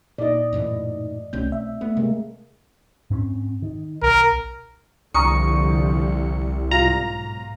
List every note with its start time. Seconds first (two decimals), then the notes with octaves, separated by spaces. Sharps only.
0.18 A#2 D#4 D5 D#5
0.53 F#2 A2 E3
1.33 C2 B2 A3 C4 C#4 G6
1.52 E5
1.81 A3 B3
1.97 C3 G#3 A#3
3.10 G#2 C4 C#4
3.62 D#3
4.02 B1 A#4
5.14 C2 D3 F3 A#5 C#6 D#6 C#7
6.71 B1 G#2 F4 A#5